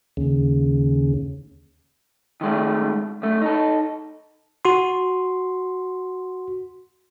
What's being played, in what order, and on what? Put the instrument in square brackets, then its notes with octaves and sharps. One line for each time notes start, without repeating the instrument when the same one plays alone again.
[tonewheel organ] D#2 C#3
[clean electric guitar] D#3 F3 G#3 A3
F#2 A3
D#4 A4
[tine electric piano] F#4 C6